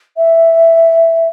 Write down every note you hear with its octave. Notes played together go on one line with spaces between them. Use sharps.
E5